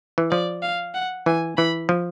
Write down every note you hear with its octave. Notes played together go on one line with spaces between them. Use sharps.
E3
F3 D5
F5
F#5
E3 G#5
E3 B5
F3